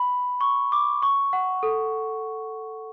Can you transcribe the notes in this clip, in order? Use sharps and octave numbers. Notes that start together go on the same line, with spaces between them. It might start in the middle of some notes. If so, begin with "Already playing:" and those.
Already playing: B5
C#6
D6
C#6
F#5
A4